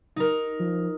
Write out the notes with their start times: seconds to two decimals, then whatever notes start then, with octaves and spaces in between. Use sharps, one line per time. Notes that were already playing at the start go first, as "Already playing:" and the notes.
0.16 D#4 A#4
0.60 F3